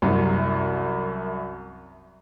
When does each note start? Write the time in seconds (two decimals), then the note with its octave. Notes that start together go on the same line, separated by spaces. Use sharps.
0.02 C2 F#2